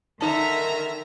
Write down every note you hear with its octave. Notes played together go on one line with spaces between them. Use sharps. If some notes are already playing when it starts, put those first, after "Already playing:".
D3 D#3 D#4 E5 A5 A#5 F6